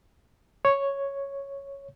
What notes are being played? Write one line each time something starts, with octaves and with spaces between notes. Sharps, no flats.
C#5